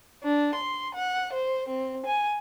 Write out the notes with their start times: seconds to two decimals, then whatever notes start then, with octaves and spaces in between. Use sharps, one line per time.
0.23 D4
0.55 C6
0.95 F#5
1.33 C5
1.69 C4
2.06 G#5